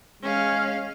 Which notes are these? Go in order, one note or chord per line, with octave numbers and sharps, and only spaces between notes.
G#3 C#4 F5